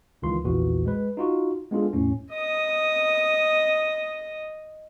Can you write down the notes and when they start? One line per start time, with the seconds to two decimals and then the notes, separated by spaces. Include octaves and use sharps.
0.22 C#2 D#3 E3 F4 C6
0.45 A#1 E2 A#2 E3 F#4
0.85 G#3 B4
1.17 D#4 F4 F#4
1.71 G#3 B3 D4 F4 G#4 A4
1.93 E2 A2 C#4
2.33 D#5 D#6